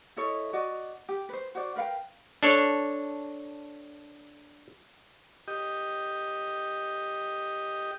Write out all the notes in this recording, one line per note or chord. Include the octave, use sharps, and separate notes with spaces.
E4 A4 C#5 D#5
F#4 D5 D#5
G4
B4 C5
F#4 C5 D5
A#4 B4 F5 G5
D4 A4 C#5
G4 D#5